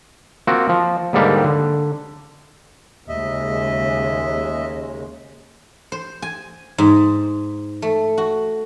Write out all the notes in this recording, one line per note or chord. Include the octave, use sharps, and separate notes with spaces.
A#3 C4 F4 F#4
F3
D#2 G#2 D3 G3 A#3
D3
D#2 C#3 G#3 D#5 E5
C5
G#5
G#2
A3
F#4